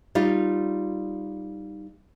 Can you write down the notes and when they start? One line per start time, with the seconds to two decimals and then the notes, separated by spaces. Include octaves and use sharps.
0.15 G3 D#4 F4